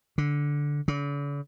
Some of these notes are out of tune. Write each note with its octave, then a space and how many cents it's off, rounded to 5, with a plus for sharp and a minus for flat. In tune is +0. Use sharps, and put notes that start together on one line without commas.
D3 -10
D3 -45